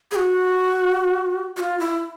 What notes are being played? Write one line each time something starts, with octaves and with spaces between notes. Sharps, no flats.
G#4
F#4
F#4
F4
E4